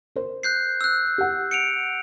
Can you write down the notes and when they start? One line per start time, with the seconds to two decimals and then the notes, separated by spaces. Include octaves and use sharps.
0.16 A#4 C5
0.43 F#6 G6 C7
0.81 E6 F#6
1.18 G4 F#5
1.51 C#7 D7 F7